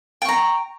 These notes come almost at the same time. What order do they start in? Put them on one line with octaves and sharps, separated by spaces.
G5 C#6 A#5